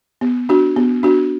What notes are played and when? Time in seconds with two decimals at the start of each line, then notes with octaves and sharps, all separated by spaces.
0.21 B3
0.49 D4 F#4
0.76 B3
1.03 D4 F#4